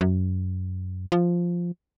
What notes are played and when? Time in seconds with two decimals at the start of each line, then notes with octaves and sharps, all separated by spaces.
0.01 F#2
1.12 F3